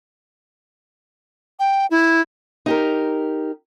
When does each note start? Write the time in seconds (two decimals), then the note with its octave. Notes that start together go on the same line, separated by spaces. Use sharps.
1.59 G5
1.91 E4
2.66 D#4 G4 A#4